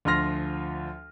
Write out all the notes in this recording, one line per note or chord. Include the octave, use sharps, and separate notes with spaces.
D2 F3 F4 C6 F6 A#6